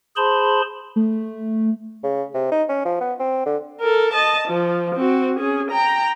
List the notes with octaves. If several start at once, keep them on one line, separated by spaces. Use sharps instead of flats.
G#4 C5 A5 B5 C6
A3
C#3
C3
D#4
C#4
F3
B3
C4
D3
A4 A#4
D#5 A5
F3
C4 F#4
C#4 G#4
G5 A#5